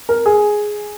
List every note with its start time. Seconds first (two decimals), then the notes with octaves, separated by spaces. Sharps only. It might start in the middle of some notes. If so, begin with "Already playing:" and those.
0.09 A#4
0.26 G#4